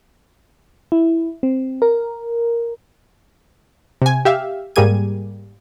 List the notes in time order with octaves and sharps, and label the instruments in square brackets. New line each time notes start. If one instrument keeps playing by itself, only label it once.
[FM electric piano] E4
C4
A#4
[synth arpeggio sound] C3 G#5
G4 E5 F5
G#2 G3 A#3 G#4 G#6 D#7